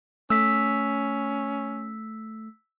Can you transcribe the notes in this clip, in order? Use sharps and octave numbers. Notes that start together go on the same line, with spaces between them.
A3 C#4 E6 B6